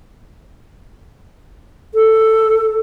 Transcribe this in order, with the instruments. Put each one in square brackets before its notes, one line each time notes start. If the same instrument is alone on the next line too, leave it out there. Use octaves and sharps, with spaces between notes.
[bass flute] A4